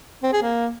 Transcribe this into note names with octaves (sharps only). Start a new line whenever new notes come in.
C4
G#4
A#3